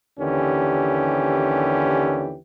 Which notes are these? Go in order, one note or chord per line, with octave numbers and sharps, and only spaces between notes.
D#2 D3 E3 C#4 G4